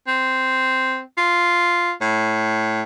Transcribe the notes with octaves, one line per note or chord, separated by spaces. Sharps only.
C4
F4
A2